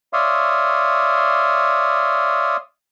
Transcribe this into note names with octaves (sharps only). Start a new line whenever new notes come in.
C#5 D5 E5 F5 C6 D#6